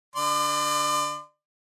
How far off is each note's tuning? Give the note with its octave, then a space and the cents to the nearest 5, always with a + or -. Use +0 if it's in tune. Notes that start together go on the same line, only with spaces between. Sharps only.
D3 +0 D5 +35 C6 -40